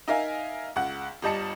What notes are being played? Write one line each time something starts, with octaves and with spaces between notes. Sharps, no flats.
D#4 A#4 E5 F5 G#5
C#2 F#5
G1 G3 D#5 A5 C#7